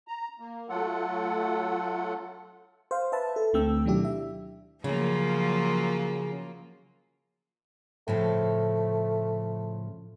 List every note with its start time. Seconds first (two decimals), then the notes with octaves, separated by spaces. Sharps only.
0.08 A#5
0.40 A#3
0.69 F#3 A3 F4 A4 F#5
2.91 C5 F5
3.12 B4 E5 A5
3.36 A4
3.53 D2 D3 A3 C4 G5 E6
3.85 B2 D#3 F#3 D4 E4 G4
4.05 E5
4.84 C#3 F3 F#3 A#3 F4
8.08 A2 C#3 F3 A3